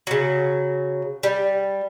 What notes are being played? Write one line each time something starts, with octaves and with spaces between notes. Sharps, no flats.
C#3 F#3
G3